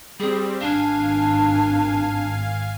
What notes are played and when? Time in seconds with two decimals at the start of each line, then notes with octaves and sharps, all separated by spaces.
0.20 G3 C4 G#4
0.61 G#1 D4 F5 G#5